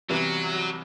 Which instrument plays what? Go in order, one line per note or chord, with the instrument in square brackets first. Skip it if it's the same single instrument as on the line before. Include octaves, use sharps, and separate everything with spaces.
[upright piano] C2 C3 E3 G3 B3 [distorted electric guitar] F#3